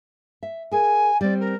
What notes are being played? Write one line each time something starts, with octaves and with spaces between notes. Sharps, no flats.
E5
G#4 A#4 G#5
G3 C4 D5
A#4